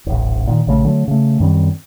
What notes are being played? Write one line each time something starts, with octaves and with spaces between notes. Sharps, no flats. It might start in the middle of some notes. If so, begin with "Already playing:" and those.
D#1 A1
A#2 D3 D#3
A#1 C#3 A3
D3 F#3 A3
C#3 A3
F#2 D#3 G3 C4